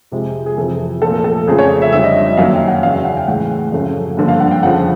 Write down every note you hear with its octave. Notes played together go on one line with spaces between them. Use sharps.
F2 C3 F3 G#3
G#4
F2 C3 E3 A4
A#2 F3 A3 A4
A#4
A4
F2 C#3 F3 A3 G#4
C#5
E5
F2 D3 G3 E5
D#5
D#5
E5
F#2 D#3 F#3 A#3 F5
G5
F#5
E2 C#3 F#3 F5
E5
F#5
G5
A2 E3 G#3 F#5
F#2 C#3 F3 A3
G2 D3 F3 A#3
F5
F#5
G5
F2 C#3 F3 F#5